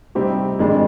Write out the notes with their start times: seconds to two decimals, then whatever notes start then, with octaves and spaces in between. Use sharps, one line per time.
0.15 C3 G3 C4 D#4 G4
0.59 F2 D#3 G#3 D4